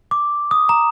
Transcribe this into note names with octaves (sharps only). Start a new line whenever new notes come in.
D6
D#6
A#5